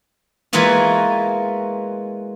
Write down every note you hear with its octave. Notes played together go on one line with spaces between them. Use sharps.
E3 G#3 A#3 B3 F4 F#4